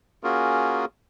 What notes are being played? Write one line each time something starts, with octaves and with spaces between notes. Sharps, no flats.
A#3 C#4 F4 F#4 G#4 A#4